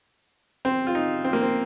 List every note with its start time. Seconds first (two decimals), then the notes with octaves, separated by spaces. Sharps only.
0.65 C4
0.87 F4
0.95 D#4
1.24 C4
1.33 A#3
1.42 C4